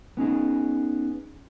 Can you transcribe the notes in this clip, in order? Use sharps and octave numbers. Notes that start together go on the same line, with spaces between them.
B3 C#4 D#4 G#4